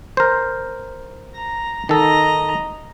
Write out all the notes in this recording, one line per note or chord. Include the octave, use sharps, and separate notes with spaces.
A#4 C5
A#5
D#3 A4 D#5 A#5